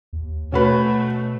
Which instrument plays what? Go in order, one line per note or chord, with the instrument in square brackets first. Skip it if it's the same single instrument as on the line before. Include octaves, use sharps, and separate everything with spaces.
[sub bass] D#2
[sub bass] B2 [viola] A3 [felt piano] C#4 F#4 B4